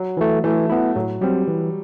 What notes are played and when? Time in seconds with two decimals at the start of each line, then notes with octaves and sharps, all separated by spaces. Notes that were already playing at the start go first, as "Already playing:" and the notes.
Already playing: F#3
0.17 E3 A3
0.44 E3 A3
0.70 B3 E4
0.95 A2 F#3
1.21 F#3 G3 C4
1.47 E3